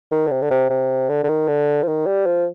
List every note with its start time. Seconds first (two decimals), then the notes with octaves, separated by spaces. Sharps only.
0.12 D#3
0.27 D3
0.31 C3
0.42 D3
0.51 C3
0.70 C3
1.09 D3
1.24 D3
1.28 D#3
1.48 D3
1.83 F3
1.87 D#3
2.06 G3
2.26 F3